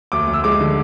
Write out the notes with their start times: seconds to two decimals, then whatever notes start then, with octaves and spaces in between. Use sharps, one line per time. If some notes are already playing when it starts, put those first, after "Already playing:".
0.12 D2 D6
0.28 D2
0.33 E6
0.44 G#3 D6
0.60 D3